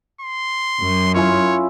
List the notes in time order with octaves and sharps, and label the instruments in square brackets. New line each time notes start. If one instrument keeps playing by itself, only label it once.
[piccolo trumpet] C6
[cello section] F#2
[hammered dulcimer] C#4 E4 F4 [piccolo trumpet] C#5